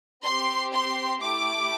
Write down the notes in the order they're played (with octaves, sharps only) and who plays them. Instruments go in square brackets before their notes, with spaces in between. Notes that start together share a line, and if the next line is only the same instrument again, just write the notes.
[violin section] C4 G4 C6
C6
A3 E4 G4 D6